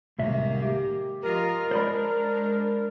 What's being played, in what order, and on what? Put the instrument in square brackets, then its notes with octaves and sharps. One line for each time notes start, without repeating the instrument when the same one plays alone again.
[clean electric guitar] C2 A2 E5 [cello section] D#3 G#3 A#3
[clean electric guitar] G4
[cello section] F3 F4 D#5 [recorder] A#4
[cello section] G#3 D4 [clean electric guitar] C5 D5 B5